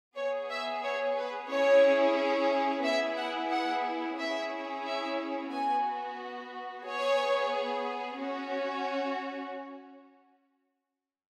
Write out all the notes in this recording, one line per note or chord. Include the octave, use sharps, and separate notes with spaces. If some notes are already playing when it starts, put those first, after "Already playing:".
B3 G#4 C#5
E5
C#5
B4
C#4 E4 G#4 C#5
B3 E4 G#4 E5
F#5
F#5
C#4 E4 G#4 E5
E5
B3 F#4 G#5
B3 G#4 C#5
C#4 F#4